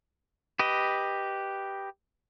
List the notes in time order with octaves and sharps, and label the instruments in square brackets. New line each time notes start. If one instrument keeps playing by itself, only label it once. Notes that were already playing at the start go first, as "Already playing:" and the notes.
[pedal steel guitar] G4 B4 D#5